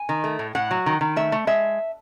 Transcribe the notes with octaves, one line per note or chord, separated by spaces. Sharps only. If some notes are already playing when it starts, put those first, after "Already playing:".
Already playing: G#5
D#3
A3
A2
A2 F#5
F#3
D#3
D#3
A3 E5
A3
G#3 E5